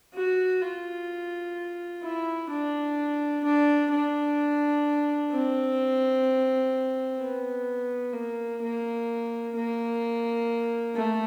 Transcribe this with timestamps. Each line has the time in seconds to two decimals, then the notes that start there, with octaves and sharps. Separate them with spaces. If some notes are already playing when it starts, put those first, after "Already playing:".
0.14 F#4
0.61 F4
2.03 E4
2.50 D4
3.44 D4
3.91 D4
5.32 C4
7.20 B3
8.14 A#3
8.61 A#3
9.56 A#3
10.96 A3